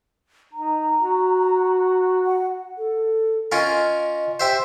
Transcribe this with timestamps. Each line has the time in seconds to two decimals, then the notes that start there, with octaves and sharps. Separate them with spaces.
0.53 D#4 A#5
0.99 F#4
2.26 F#5
2.77 A4
3.52 C#4 F4 A#4 D#5
4.40 G4 C5 E5 G5